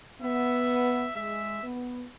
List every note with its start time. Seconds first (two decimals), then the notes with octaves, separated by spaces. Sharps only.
0.21 B3 E5
1.16 G#3 E5
1.63 B3